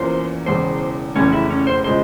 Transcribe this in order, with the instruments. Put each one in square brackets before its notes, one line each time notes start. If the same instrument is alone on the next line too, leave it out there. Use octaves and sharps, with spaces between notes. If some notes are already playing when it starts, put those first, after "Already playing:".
Already playing: [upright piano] E2 E3 A#3 C#4 F4 [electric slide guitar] C5
[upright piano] E1 E2 C#3 [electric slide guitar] C5
[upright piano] F1 E2 C#3 [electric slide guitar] C#4
[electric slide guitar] E4
C#4
C5
[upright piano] C#3 F3 G#3 [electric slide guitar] C5